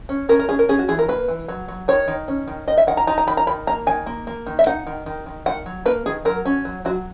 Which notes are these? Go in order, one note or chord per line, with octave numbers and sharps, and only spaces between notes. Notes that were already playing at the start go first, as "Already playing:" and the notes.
C#4
C#4 A#4
A#4
C#4 G#4
A#4
C#4 G#4
F#4
E3 G#4
A#4
A#3 B4
E3
F#3
F#3
D#3 C#5
D#3
C#4
D#3
D#3 D#5
E5
D#3 F#5
A#5
D#4 A#5
A#5
D#3 B5
A#5
D#3 B5
A#3 A#5
D#3 G#5
A#3
A#3
D#3
E5
D#4 F#5
D#3
D#3
D#3
D#3 F#5
F#3
A#3 B4
D#3 G#4
F#3 A#4
C#4
F#3
F#3 F#4